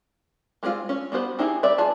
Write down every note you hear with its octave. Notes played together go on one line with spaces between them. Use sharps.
G3 G#3 C4 D4 F4
C#4
G3 B3 F#4 C5
C4 D#4 E4 G4 G#4
G3 C4 D5 E5
F4 G#4 B4 A5